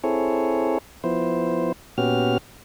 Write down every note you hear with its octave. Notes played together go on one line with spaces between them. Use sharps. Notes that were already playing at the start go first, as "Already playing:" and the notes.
C4 E4 G#4 A4 C#5
F3 B3 E4 C5
A#2 B3 C#4 F#4 G4 F6